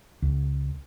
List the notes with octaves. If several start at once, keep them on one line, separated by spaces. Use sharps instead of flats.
C#2